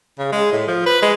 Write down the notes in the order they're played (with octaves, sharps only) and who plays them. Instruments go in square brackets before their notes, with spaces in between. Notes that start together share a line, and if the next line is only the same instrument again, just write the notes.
[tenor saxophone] C#3
G#3
A2
F3
B4
G#3